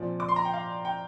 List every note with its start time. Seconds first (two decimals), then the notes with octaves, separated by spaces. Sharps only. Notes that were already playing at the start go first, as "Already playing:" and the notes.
Already playing: A#2 F3 C4 D5
0.20 D6
0.29 C6
0.36 A#5
0.45 G5
0.54 F5
0.85 G5